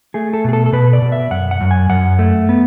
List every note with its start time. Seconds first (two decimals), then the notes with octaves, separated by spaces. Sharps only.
0.14 A3 G#4
0.33 A4
0.44 B2 G#4
0.53 A4
0.66 A4
0.73 B2 B4
0.93 D5
1.02 B2
1.12 E5
1.31 F#2 F#5
1.51 F#5
1.61 F#2
1.71 G#5
1.90 F#2 F#5
2.19 A3
2.49 B3